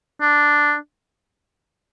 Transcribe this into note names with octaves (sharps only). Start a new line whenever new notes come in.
D4